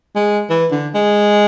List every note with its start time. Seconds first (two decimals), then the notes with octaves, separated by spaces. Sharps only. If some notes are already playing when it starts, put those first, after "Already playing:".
0.16 G#3
0.50 E3
0.72 D3
0.95 G#3